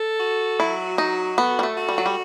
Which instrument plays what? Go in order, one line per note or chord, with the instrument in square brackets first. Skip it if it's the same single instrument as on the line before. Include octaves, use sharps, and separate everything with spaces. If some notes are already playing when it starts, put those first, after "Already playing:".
Already playing: [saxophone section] A4
F#4
[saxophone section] F#3 [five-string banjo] E4
[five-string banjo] D#4 [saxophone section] F#4
[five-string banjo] B3 [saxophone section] A4
[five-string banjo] G3
A3
[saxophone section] F#4
[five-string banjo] G3
F#3
G3